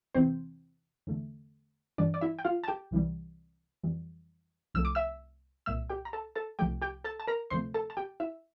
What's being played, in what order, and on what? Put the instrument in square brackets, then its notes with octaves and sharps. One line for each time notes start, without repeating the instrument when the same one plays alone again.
[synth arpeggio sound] E2 C3 E3 C4 C5
E2 D3 A3
G2 E3 G3 D4 D5
D5
E4 E5
G5
F4 F5
A5
G4 G5
C2 C3 E3 G3
F2 E3 G3
C2 C3 F3 A3 E6
D6
E5 E6
C2 A#2 G3 E5 E6
G4 G5
A#5
A4 A5
A4 A5
C2 C3 F3 A3 G4 G5
G4 G5
A4 A5
A5
A#4 A#5
D2 C3 F3 A3 C5 C6
A4 A5
A5
G4 G5
E4 E5